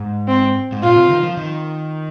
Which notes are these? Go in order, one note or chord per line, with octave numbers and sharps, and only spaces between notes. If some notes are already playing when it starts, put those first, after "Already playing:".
Already playing: G#2
C4
G#2
A#2 F4
C3
D#3
F3
D#3